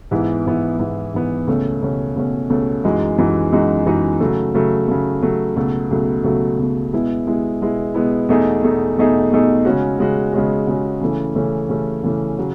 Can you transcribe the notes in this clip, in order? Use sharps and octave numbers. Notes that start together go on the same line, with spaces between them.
G#2 E3 B3 E4
G#2 E3 B3 E4
G#2 E3 B3 E4
G#2 E3 B3 E4
C#2 B2 A3 C#4
C#2 B2 A3 C#4
C#2 B2 A3 C#4
C#2 B2 A3 C#4
F#2 E3 G#3 D#4 F#4
F#2 E3 G#3 D#4 F#4
F#2 E3 G#3 D#4 F#4
F#2 E3 G#3 D#4 F#4
C#3 F#3 A3
C#3 F#3 A3
C#3 F#3 A3
C#3 F#3 A3
C#2 B2 F#3 A3
C#2 B2 F#3 A3
C#2 B2 F#3 A3
C#2 B2 F#3 A3
B2 G#3 B3 E4
B2 G#3 B3 E4
B2 G#3 B3 E4
B2 G#3 B3 E4
E2 B2 A3 D#4 G#4
E2 B2 A3 D#4 G#4
E2 B2 A3 D#4 G#4
E2 B2 A3 D#4 G#4
C#3 G#3 C#4 F#4
C#3 G#3 C#4 F#4
C#3 G#3 C#4 F#4
C#3 G#3 C#4 F#4
C#3 E3 A3 C#4
C#3 E3 A3 C#4
C#3 E3 A3 C#4
C#3 E3 A3 C#4
C#3 F#3